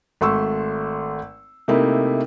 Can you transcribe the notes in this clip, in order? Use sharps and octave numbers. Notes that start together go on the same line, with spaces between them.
G#1 A3 C6 C#6 E6
C3 A3 A#3 D#4 E4